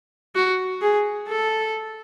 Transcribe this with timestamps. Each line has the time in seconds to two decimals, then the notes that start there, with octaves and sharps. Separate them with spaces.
0.35 F#4
0.81 G#4
1.28 A4